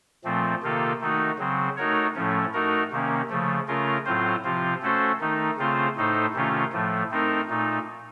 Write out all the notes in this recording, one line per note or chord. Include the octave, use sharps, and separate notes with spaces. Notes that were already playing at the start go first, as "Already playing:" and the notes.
A#2 F3 A3 C4
C3 D#3 A#3 F4 A4
D#3 A3 D#4 F#4
C#3 F#3 C4
A3 D#4 F#4 A#4 C#5
A2 F3 A3 C#4
A3 D#4 F#4 A#4
C3 D#3 A#3 C#4
C#3 F3 A3
C#3 A3 C#4 F4 A#4
A2 F#3 C4 F4 C5
C3 F3 C4 F4
A3 C#4 F#4 A4 C5
D#3 A3 D#4
C#3 A3 C4 F4 C5
A2 A3 D#4 A4 C5
C3 D#3 A3 C#4 F4
A2 F3 A3
A3 C4 D#4 A#4
A#2 A3 D#4